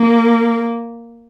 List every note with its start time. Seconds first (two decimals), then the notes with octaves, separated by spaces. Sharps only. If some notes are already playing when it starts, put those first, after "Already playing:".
Already playing: A#3